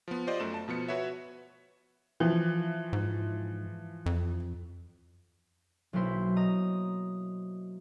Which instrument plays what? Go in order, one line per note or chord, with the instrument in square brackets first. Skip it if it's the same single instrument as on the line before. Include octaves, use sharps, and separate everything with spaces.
[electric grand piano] F3 B3
F4 G4 C5 D5 D#5
F#2 A3 E7
A5
B2 F3 B3 C#7
F#4 B4 C#5 E5
[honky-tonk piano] E3 F3
[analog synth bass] G#2
F2
[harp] B1 F#3 A#3 E4 C5 B6
D#5 A#5 D#6